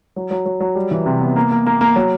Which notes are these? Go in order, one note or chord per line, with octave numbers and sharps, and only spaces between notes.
F#3
F#3
F#3
F#3
G3
E3
C3
B3
A#3
A#3
A#3
A#3
F#3